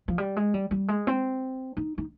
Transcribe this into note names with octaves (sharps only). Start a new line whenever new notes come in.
F3
G3
G#3
G3
G3
G#3
C4
D#4
D#4